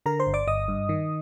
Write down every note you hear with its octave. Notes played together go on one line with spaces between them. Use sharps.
D3 A#4 A#5
C5 C6
G1
D5 D6
G1 D#5 D#6
G2
D#3